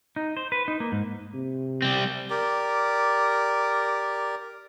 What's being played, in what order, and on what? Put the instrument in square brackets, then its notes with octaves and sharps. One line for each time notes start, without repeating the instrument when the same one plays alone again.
[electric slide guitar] D#4
C5
B4
D#4
A#3
G#2
[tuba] C3
[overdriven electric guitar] G3 C4
[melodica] G4 A#4 D5